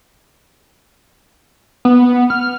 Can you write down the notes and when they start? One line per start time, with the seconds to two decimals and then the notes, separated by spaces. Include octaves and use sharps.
1.85 B3
2.30 F6